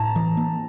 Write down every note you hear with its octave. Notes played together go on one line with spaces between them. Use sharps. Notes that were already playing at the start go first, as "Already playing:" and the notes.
Already playing: A2 A5 A#5
E3
A#3